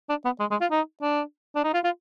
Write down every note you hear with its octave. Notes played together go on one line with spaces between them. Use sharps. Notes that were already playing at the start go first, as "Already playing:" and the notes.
D4
B3
G#3
G#3
F4
D#4
D4
D4
D#4
F4
F4